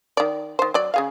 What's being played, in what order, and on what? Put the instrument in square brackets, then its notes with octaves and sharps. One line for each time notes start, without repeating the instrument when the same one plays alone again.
[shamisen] D#3 D5
D#3 C5
F#3 D5
C#3 G#4 F5